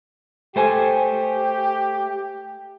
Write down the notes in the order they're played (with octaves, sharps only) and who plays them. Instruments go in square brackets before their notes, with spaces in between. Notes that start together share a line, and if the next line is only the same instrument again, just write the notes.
[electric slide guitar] A3 C5 G#5 [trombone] G4